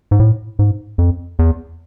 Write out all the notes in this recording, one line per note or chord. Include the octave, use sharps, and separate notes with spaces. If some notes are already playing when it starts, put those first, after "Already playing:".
G#2
A2
G#2
F2
E2